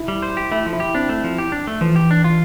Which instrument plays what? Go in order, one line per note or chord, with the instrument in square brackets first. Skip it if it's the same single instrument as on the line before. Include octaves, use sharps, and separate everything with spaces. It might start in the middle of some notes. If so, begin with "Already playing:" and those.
Already playing: [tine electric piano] E4
[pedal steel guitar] G3
C5
G4
[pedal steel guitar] A3 [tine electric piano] E4
[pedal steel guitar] F3
[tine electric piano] E4
[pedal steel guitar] G4
[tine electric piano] C4 [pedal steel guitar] D4
[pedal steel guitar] A3
F3
G4
D4
A3
[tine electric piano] E3 [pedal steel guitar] F3
[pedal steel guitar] G4
D4
F4